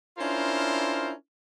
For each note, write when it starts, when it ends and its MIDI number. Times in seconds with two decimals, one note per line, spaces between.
0.18 1.11 61
0.18 1.11 62
0.18 1.11 64
0.18 1.11 65
0.18 1.11 70
0.18 1.11 72